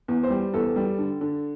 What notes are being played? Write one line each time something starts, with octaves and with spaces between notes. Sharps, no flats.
E2
C5
G3
E2 A4
G3
D3
D3